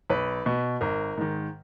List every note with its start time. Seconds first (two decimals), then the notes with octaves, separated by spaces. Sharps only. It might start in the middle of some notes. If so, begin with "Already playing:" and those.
0.10 B1 B4
0.46 B2
0.81 G#1 A#4
1.17 G#2 D#3